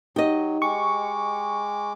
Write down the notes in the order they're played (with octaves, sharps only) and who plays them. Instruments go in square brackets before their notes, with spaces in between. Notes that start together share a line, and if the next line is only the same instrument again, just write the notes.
[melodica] F#3 [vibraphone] D#4 [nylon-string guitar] G4 D#5
[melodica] G#3 D6 [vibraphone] G5 [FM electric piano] C#6